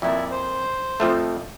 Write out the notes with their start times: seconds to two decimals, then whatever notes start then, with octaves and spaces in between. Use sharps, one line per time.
0.02 F2 A#2 E4 D5 E5
0.31 C5
1.00 F2 F3 A3